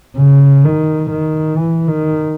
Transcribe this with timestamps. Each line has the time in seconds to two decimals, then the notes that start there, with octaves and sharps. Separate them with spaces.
0.17 C#3
0.65 D#3
1.11 D#3
1.58 E3
1.88 D#3